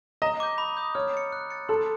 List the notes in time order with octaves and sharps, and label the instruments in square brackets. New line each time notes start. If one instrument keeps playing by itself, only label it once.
[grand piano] D#5 [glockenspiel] A#5
[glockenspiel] D6 G6
B5
D#6 G6
[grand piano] C#5 [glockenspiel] F6
[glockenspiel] A6 C#7
F#6
A6 C#7
[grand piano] A4 [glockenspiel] C6